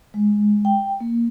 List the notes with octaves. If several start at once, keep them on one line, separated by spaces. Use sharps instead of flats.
G#3
G5
A#3